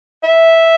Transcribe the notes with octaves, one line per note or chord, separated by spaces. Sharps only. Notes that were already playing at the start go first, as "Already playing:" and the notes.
E5